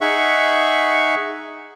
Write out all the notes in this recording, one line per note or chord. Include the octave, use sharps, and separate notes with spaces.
D#4 G#4 E5 F#5 C#6